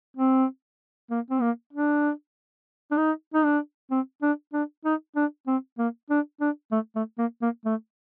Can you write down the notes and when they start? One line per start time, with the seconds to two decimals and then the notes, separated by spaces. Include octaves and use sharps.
0.16 C4
1.10 A#3
1.30 C4
1.41 A#3
1.73 D4
2.91 D4
2.97 D#4
3.34 D#4
3.44 D4
3.91 C4
4.22 D4
4.53 D4
4.85 D#4
5.16 D4
5.47 C4
5.78 A#3
6.10 D4
6.40 D4
6.72 A3
6.95 A3
7.18 A#3
7.42 A#3
7.65 A3